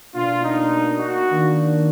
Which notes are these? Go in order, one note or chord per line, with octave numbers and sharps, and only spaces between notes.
B2 A#3 D4 F4
D#4
F#4
D#3 A#3 D4